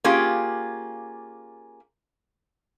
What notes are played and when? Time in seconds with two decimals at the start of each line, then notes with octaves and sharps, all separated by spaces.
0.04 A#3 C#4 F4 G4 G#4